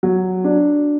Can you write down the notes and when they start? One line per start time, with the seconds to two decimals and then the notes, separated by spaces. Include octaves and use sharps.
0.03 F#3
0.44 D4